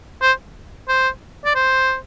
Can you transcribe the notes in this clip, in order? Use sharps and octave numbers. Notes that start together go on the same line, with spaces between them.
C5
C5
D5
C5